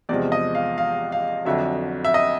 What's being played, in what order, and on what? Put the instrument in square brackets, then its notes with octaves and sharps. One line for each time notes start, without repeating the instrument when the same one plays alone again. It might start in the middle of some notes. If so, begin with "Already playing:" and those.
[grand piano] E2 C3 F3 G#3 D5
D#5
F5
F5
F5
F2 D3 F#3 E5
E5
D#5